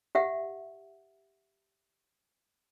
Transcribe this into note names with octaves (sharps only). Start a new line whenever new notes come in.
G4 E5 F#5